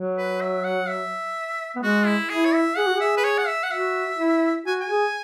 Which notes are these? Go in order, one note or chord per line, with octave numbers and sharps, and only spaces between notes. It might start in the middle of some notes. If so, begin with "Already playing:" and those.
Already playing: F#3
B4
E5
F#5
E5
B3
G#3 F#4
E4
E4 G#4
C#5
E5
G#4 F#5
F#4
G#4
E5
B4
C#5
F#5
E5
F#5
F#4 E5
E4
F#4 G#5
G#5
G#4